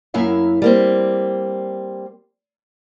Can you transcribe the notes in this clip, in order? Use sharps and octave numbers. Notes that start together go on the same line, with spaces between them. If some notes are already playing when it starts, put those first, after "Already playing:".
F#2 A#3 E4 E5 F5
G3 A#3 C4